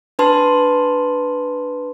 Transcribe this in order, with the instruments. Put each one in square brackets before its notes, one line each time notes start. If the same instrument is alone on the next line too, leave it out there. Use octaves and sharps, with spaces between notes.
[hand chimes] D4 B4 A5 C6